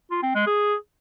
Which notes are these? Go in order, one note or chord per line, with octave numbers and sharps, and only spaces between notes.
F4
C4
G#3
G#4